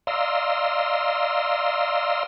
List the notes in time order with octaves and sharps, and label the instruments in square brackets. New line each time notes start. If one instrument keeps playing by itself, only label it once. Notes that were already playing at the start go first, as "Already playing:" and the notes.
[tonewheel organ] D5 D#5 F5 A#5 C6 E6